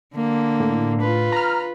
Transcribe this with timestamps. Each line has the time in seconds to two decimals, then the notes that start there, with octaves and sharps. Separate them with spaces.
0.14 D3 A#3
0.60 A2
1.01 F4 B4
1.32 A#5 F6